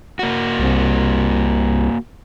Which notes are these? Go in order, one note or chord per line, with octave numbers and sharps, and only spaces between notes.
A#3 F#4
C2